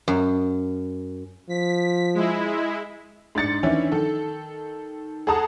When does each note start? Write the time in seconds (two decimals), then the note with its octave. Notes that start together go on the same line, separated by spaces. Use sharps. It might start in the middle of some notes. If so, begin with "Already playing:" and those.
0.08 F#2
1.49 F3 B6
2.14 G#3 E4
3.35 G#2 D4 A6 C#7
3.63 D#3 E3 C#4 D4 E4
3.92 D#3 A4
5.27 G#4 A4 F#5 A5 A#5 D#6